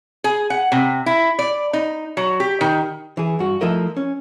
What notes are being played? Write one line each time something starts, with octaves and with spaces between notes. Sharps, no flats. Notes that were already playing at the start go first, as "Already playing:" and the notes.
G#4
F#5
C3
E4
D5
D#4
F#3
G4
D#3
E3 G#4
G2 F#4
F3 A3 E4 A#4 D#5
C#4